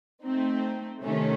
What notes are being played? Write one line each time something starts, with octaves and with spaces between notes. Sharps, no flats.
A3 C4 D#4
C3 D#3 A3 C#4